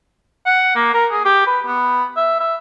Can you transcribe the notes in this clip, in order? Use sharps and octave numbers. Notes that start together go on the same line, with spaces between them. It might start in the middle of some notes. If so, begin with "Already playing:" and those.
F#5
A#3
A#4
G#4
G4
B4
B3
E5
E5